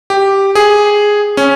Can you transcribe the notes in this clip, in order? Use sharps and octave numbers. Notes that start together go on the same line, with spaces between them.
G4
G#4
C#4